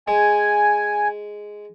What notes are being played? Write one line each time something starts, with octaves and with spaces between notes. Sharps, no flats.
G#3 G#5